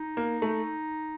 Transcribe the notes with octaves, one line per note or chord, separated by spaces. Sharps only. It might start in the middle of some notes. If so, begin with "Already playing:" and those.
Already playing: D#4
A#3
A3